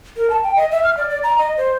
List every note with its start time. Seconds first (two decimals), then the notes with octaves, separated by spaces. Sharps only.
0.16 A#4
0.30 A5
0.43 G5
0.56 D#5
0.71 E5
0.84 F6
0.97 D5
1.10 D5
1.23 A#5
1.38 D#5
1.57 C5